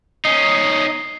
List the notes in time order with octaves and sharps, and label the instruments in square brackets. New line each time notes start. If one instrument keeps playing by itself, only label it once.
[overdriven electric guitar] C#4 D#4 [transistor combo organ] D#5 [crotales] C7